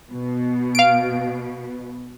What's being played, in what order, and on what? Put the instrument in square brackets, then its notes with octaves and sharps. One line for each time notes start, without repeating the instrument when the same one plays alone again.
[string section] B2
[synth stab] F5 D7